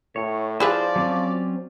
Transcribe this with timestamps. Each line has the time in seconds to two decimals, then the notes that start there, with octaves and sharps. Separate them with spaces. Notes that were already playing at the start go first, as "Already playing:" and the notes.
0.16 A2 C#5
0.60 F3 E4 G#4 B4 C5 D5 F5
0.96 F#3 C4 C#4